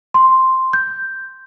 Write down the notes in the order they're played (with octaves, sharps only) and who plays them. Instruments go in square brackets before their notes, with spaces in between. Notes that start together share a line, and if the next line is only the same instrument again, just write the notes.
[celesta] C6
G6